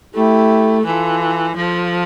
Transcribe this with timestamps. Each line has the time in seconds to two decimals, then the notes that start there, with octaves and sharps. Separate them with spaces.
0.15 A3 E4 G4
0.85 E3 F4 A4
1.56 F3 F4 A4